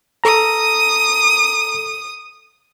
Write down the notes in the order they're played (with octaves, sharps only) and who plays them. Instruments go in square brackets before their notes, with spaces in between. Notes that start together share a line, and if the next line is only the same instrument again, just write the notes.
[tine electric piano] A4 A#5 [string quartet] D#6